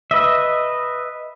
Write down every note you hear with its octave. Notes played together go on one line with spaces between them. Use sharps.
B4 D#5 E5